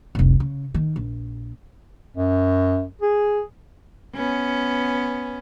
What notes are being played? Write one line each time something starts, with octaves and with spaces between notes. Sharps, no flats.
F1 C2
C#3
D#3
A#1
F#2
G#4
B3 C#4